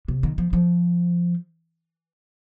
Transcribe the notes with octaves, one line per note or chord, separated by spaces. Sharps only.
C3
D#3
F3
F3